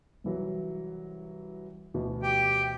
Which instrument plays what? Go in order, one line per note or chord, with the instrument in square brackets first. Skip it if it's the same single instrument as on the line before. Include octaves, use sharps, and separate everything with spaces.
[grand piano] C2 E3 F#3
D2 B2 E3
[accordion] G4 G5